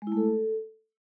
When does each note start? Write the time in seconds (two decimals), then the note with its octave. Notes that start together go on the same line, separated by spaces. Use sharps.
0.02 G#3
0.07 E4
0.12 A3
0.17 A4